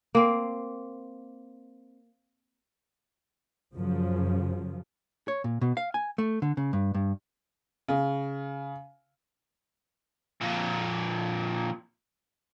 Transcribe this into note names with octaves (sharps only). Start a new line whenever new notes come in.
A#3 C4
F#2 C#3 F3 F#3
C#5
A#2
B2
F5
G#5
A3
D3
C#3
G2
G2
C#3
F2 A#2